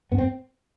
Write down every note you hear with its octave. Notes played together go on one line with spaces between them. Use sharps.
G2 B3
C4